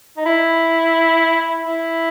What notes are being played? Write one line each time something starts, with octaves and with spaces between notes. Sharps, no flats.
D#4
E4
E4